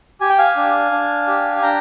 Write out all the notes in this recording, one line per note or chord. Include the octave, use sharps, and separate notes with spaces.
G4 G#5
G5
F5 G#5
D4
D4
G4
G#5
D4 G5 A#5